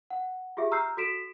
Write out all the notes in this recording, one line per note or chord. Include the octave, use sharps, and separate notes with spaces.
F#5
F4 G4 G#4 E5
A#5 E6 F6 G6 C7
F#4 A4 B6 D7 E7